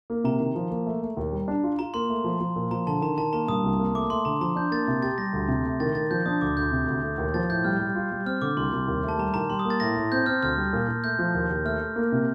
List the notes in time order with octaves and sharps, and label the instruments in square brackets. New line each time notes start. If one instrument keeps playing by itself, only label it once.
[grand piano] A#3
[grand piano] C3 [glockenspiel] A#5
[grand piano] D#3
F3
A#3
A3
A3
D#2
G3
D4
F4
[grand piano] F4 [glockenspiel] A#5
[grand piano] A#3 [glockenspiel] C6
[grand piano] A3
F3
F3
A#2
[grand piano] F3 [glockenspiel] A#5
[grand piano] D3 [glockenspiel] A5
[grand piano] D#3 [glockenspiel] A#5
[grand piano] D#3 [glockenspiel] A5
[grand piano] A#3 [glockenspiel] A#5
[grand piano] G2 [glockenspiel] D#6
[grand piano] C2
A#3
[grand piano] A3 [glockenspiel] D6
[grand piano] A3 [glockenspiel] C6
[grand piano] D3 [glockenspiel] A#5
[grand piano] F3 [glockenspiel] A#5
[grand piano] D4 [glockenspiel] G6
[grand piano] A#3 [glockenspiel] A6
[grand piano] C3 [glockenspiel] A6
[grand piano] G4 [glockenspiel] A6
[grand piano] G3 [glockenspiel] A#6
[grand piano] D2
C3
A3
[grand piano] D#3 [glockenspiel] A6
[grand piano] D#3 [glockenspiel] A6
[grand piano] F3 [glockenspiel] G6
[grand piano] D4 [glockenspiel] D#6
[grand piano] D2 [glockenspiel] D6
[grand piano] D2 [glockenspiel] G6
[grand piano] C3
D2
A3
D#2
[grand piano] F3 [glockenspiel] A6
[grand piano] A2 [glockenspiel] G6
[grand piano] G3 [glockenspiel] F6
[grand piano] G3
F4
G3
[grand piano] C4 [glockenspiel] F6
[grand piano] D3 [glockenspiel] D6
[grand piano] C2 [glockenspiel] C6
[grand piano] C2
D#2
A3
[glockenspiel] A5
[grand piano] G3 [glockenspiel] A#5
[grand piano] D#3 [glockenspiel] A#5
[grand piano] G3 [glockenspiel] C6
[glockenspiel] D#6
[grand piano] A#3
[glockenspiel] A6
[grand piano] A2 [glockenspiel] A#6
[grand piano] A2
[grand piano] C4 [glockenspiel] G6
[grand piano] C4 [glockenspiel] F6
[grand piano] D2 [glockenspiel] F6
[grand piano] G3
A#2
A#2
[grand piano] A3 [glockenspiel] G6
[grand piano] F3
D#2
D#2
[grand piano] A3 [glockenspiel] F6
[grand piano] A3
A#3
C3